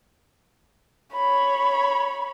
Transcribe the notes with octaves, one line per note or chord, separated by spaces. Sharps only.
C#5 B5